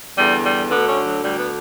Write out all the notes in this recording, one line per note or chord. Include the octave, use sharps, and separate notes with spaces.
E2 D3 G3
G3
D2 D3 B3
C#4
F#3
D2 D3 G3
B3